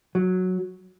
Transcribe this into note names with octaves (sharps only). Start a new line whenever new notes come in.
F#3